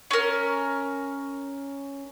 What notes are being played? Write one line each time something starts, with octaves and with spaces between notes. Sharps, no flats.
C#4 A#4